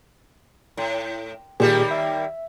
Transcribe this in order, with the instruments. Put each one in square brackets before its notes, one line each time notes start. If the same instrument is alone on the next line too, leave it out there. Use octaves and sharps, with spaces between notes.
[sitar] A2
[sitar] D#2 G3 A#3 [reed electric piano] A#2 G4 G#4
[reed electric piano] E5